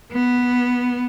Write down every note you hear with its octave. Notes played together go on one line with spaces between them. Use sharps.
B3